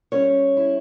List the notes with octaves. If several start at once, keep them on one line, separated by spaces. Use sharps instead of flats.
G3 C#4 C#5
E4